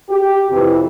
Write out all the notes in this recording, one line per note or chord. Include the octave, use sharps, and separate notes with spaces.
G4
F2 C3 E3